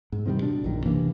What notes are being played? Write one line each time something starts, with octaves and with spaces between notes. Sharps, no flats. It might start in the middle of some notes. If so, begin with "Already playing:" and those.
G#2
C3 D#3 F#3 G3
B2 D4
A#1 F#2 D#3
C3 E3 A#3 D4